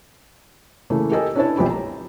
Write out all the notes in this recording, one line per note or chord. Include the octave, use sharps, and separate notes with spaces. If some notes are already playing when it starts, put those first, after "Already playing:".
C#3 E3 A3 A#3
G4 A4 A#4 D#5 G#5 E6
C#4 D4 E4 B4 C#5 A5
B1 F2 G4 B5
A#5